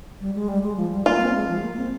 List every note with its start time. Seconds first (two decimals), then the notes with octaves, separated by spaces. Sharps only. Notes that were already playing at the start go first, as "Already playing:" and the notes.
0.21 G3
0.35 G#3
0.48 G3
0.63 G#3
0.77 F3
0.91 G3
1.06 A#3 F4
1.20 C4
1.34 G#3
1.49 F3
1.58 G#3
1.63 A#3
1.77 C4